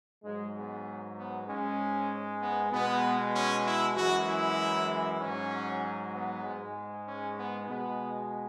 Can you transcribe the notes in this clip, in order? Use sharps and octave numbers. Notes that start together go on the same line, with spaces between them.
G#2 F#3 G#3
B3
B3
G#2 G#3 C#4
B3
B2 G#3 B3
C#4
E4
F#2 E3 G#3 F#4
E4
G#2 F#3 C#4
B3
G#2 G#3
C#4
B3
B2 G#3 B3